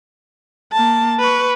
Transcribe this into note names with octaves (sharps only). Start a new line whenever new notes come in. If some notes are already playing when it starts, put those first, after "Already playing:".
A#3 A5
B4 C#6